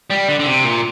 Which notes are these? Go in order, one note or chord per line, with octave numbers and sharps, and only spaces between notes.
G3
D3
D3
C3
A#2